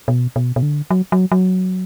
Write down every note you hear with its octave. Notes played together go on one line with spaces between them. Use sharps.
B2
B2
B2
D3
F#3
F#3
F#3